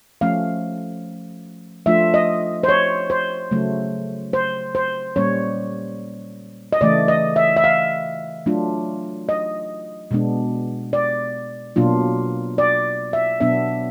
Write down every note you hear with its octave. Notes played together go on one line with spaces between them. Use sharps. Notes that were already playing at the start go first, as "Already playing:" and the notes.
F3 A3 C#4 F5
F3 A3 D4 F4 E5
D#5
C5
C#5
C5
C#3 F#3 A3
C5
C5
A#2 G3 A#3 C#4 C#5
D#5
C#3 E3 A3 D5
D#5
E5
E5
F5
F#3 A3 D4 F4
D#5
B2 G#3 B3 D4
D5
B2 F#3 A#3 D4 F4
D5
E5
B2 F#3 B3 D4 E5